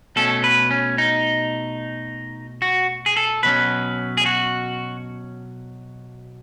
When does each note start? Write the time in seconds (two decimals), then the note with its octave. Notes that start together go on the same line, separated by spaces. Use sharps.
0.16 B2 A3 C#4 A4
0.44 B4
0.71 C#4
0.98 D#4
2.62 F#4
3.06 G#4
3.17 A4
3.43 B2 F#3 C#4 B4
4.17 G#4
4.26 F#4